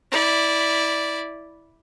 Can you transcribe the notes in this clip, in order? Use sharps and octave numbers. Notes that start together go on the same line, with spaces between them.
E4 D5